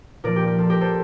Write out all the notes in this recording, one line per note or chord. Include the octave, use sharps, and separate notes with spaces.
A#2 F3 A#4 D5
G4
G4
F4 A4
G4 A#4
A4 C5